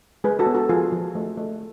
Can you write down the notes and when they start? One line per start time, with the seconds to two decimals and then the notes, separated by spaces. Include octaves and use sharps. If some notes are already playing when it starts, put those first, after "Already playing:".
0.24 G#3 G#4 B4
0.39 F#4 A4
0.46 B3
0.55 F#4 A4
0.69 F3 F4 G#4
0.92 F3
1.15 A3
1.38 A3